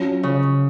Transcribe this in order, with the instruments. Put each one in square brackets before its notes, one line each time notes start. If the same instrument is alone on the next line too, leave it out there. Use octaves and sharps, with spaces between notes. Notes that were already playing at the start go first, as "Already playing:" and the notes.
Already playing: [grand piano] F#3 C#4 F4
[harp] C#3